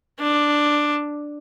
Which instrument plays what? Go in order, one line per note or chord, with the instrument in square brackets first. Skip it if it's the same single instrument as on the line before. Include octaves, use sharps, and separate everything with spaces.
[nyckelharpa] D4